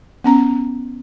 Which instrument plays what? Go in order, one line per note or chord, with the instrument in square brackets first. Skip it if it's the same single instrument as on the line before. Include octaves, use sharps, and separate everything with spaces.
[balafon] B3 C#4 A#5